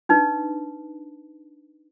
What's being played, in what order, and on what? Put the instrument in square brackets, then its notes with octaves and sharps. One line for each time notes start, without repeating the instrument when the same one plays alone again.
[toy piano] D4 D#4 B4